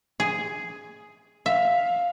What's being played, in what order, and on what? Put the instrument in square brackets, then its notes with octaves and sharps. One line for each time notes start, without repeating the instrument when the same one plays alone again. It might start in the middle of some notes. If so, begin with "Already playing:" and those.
[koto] G#4
[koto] E5 [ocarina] F5